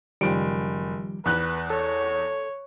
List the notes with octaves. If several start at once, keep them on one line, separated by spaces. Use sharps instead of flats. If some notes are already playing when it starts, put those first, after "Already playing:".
F#1 D#3 F3 G3 D7
E2 B4 F#6
A4 C#5